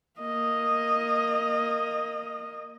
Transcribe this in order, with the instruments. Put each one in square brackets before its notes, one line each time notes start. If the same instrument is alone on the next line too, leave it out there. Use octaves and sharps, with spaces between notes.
[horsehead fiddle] A#3 D#5